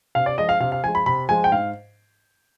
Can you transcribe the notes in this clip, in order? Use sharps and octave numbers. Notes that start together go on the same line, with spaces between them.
C3 F5
D5
F3 G#3 D#5
F5
C3 F5
F5
F3 G#3 G#5
B5
C3 B5
F3 G#3 G#5
G5
G#2 F5